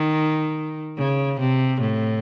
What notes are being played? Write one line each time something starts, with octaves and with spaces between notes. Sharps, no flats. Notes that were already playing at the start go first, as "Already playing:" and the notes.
Already playing: D#3
C#3
C3
A2